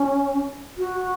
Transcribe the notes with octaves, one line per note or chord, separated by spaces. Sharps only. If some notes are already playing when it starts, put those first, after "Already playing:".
Already playing: C#4
F#4